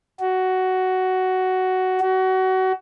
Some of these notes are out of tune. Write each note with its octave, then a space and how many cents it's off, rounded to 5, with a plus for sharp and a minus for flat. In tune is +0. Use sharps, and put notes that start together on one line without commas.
F#4 +10
F#4 +25